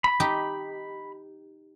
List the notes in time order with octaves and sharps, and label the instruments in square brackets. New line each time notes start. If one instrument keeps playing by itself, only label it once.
[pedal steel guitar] B5
[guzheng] D#4 G4